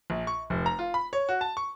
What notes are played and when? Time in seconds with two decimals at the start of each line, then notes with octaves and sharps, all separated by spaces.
0.10 A#1
0.27 C#6
0.50 F1
0.66 A#5
0.79 F4
0.94 B5
1.13 C#5
1.29 F#4
1.41 A5
1.57 C#6